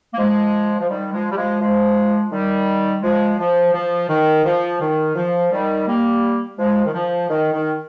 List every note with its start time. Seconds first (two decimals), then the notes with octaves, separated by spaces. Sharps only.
0.14 A#3
0.17 F3 G#3
0.79 F3
0.89 D#3 G3
1.12 F3 G#3
1.31 G3
1.36 F3 G#3
1.60 F3 G#3
2.31 D#3 G3
3.02 F3 G#3
3.38 F3
3.73 F3
4.09 D#3
4.44 F3
4.80 D#3
5.15 F3
5.51 D#3 G3
5.87 G3 A#3
6.58 F3 G#3
6.85 D#3
6.93 F3
7.29 D#3
7.53 D#3